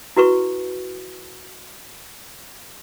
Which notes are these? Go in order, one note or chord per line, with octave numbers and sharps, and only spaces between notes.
E4 F#4 B4 C#6